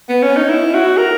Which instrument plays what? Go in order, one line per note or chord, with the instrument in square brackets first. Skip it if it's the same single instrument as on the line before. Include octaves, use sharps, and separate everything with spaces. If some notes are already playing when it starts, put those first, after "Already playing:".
[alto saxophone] B3
C#4
D#4
E4
F#4
A#4